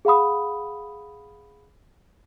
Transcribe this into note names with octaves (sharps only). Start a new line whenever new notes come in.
G#4 F5 F#5 B5 D#6